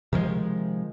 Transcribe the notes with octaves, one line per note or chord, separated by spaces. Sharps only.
C3 D#3 F3 G#3